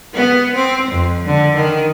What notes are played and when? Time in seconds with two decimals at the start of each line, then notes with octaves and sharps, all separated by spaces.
0.14 B3
0.55 C4
0.91 F2
1.26 D3
1.56 D#3